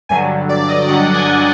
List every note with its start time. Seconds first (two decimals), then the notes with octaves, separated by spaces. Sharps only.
0.09 G2 D3 F#3 G#5
0.49 D5
0.69 D#5
0.88 G2 D3 F#3 F#5
1.14 G#5